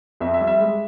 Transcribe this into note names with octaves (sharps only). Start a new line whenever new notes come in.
F2 E5
E5
G3
E5
G#3